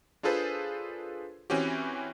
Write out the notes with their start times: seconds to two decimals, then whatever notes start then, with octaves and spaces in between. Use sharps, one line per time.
0.23 D4 F4 G#4 A4 B4 C5
1.50 E3 C4 C#4 F#4 G4